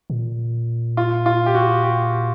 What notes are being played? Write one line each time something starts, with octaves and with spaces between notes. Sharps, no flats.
A#2
F4
F4
G4
F#4
G4